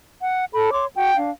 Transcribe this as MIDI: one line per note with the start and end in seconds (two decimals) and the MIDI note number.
0.20 0.44 78
0.52 0.69 69
0.52 0.69 83
0.71 0.86 73
0.71 0.86 84
0.71 0.86 86
0.95 1.14 66
0.95 1.14 78
0.95 1.14 79
1.15 1.30 62
1.15 1.30 77